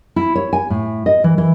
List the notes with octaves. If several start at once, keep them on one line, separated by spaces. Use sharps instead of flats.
E4
C#5
G#5
A2
D#5
E3
E3